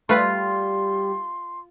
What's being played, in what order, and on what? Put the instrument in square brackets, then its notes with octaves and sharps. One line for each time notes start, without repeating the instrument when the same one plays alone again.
[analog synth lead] G3 [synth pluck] A3 B4 B6 [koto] F4 [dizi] C6